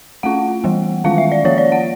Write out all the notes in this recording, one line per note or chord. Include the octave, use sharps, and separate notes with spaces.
A3 C#4 F4 F#5
E3 G3 B3
D#3 G#3 C#4 F4 F5
E5
D5
F3 A#3 C#4 F4 C#5
D5
F#5